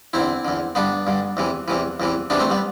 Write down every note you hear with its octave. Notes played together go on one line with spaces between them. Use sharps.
E2 D3 C4 E4
E2 D3
G2 D3 B3 D4
G2 D3
E2 C3 E3
E2 C3 E3
E2 C3 E3
E2 C3 E3 B3 D4
A3 C4
G3 B3